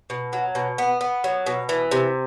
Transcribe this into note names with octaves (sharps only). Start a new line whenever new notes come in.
B2
F#3
B2
B3
B3
F#3
B2
E3
C3